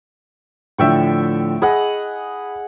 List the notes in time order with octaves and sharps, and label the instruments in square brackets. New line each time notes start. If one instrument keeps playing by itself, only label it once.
[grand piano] A2 D3 F3 [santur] E5 G5 C#6
[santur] G#4 D#5 F#5 [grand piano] B5